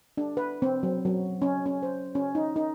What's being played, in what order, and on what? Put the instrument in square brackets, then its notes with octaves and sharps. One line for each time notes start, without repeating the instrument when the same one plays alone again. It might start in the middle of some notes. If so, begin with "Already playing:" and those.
[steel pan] D4
B4
C4
F#3
F#3
C#4
C#4
C5
C#4
D#4
D#4